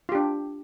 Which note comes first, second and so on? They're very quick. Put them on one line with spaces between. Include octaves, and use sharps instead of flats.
F4 G4 D4